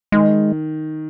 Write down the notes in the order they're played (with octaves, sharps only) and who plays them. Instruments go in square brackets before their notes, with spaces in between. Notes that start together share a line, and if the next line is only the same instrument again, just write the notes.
[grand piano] D#3 [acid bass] G#3